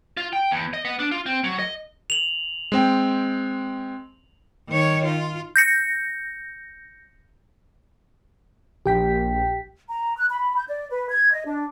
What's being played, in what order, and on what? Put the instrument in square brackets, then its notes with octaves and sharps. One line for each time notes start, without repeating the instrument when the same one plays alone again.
[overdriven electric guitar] F4
G5
E2
D#5
B3
D4
F4
C4
F#3
D#5
[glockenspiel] F7 F#7
[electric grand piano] G#3 C4 G5
[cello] D#3 C#5
F4
[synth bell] G6 A#6 C#7
[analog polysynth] A#1 [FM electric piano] G4 G5 B6
[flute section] A#5
F#6
B5
G6
D5
B4
G#6
D#5
D4